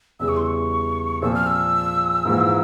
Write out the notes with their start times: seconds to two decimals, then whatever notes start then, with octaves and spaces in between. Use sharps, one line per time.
0.19 E2 C#3 E3 G3 E6
0.28 C#6
0.37 C6
0.46 C#6
1.22 A#2 F3 C4 E6
1.35 F6
1.47 E6
2.25 G#2 E3 A#3 F4